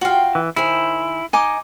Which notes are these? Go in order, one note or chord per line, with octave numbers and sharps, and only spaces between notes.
F4 F#4 F5 G5
E3
D#3 E4 G#4 C5
D#4 D#5 G#5 D6